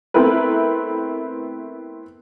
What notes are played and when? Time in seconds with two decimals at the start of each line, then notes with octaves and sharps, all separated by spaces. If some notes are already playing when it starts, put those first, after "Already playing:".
0.14 A3 B3 C4 E4 A#4 B4